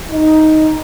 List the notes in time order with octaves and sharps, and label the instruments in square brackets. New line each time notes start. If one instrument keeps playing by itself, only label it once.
[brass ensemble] D#4